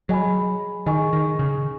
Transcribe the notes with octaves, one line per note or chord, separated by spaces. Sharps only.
F#3 G#4 D#5 G#5 B5
D#3 G#4 D#5 G#5 C#6
D#3
C#3